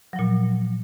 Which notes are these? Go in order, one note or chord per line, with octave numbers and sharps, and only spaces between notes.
A#2 F3 F#3